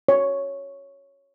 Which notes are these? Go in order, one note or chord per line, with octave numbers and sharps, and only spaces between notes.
C#5